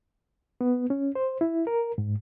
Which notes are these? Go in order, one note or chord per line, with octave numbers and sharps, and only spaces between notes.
B3
C#4
C5
E4
A#4
G#2